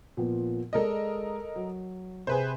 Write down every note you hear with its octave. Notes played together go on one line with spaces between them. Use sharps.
A#2 F3 B3
G#3 A4 A#4 D5 D#5
F#3
C3 G#4 B4 C5